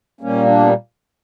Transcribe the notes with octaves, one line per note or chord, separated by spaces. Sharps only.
A#2 G3 A#3 C#4
D4
B3